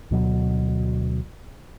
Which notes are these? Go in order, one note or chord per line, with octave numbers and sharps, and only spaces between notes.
D2 B2 F#3